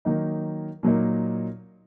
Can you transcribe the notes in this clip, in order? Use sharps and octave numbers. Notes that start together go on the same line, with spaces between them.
D#3 F#3 A#3 D#4
A#2 F#3 A#3 D#4